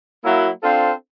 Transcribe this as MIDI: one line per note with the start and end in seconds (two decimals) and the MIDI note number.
0.24 0.49 54
0.24 0.49 58
0.24 0.49 64
0.63 0.92 60
0.63 0.92 62
0.63 0.92 65
0.63 0.92 69
0.63 0.92 72
0.63 0.92 77